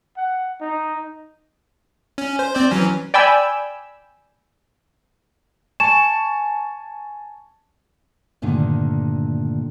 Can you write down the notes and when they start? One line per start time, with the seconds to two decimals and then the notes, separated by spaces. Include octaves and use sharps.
0.17 F#5
0.61 D#4
2.18 C#4
2.39 C5
2.55 C4 C5 D5
2.71 E3 F#3 C#4
3.14 D5 G5 G#5 B5 E6
5.80 G#5 A5 C#6 E7
8.42 G2 A#2 D3 D#3 A3